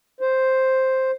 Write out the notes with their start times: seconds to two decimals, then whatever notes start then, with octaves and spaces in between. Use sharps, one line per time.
0.21 C5